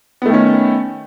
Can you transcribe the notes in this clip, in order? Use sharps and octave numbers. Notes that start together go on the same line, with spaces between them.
D#3 A3 B3 C#4